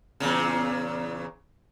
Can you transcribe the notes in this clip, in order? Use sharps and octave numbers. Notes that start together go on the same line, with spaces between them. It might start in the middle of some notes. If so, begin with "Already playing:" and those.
E2 A#2 C#3